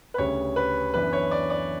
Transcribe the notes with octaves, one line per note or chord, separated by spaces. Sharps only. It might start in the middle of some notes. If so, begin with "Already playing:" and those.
B4
D2 C#3 G3 C#5
B4
F#2 E3 B3 D4 B4
C#5
D5
D5